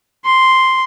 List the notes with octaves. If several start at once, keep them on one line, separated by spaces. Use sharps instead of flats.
C6